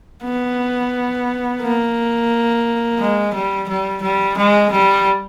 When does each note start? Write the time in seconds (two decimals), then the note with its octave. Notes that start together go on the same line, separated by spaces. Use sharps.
0.24 B3
1.62 A#3
2.99 G#3
3.34 G3
3.68 G3
4.02 G3
4.37 G#3
4.72 G3